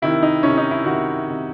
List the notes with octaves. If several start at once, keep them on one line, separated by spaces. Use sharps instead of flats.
C3 D#3 E4
D#4
C3 D#3 C#4
D#4
E4
C3 D#3 F#4
C3 D#3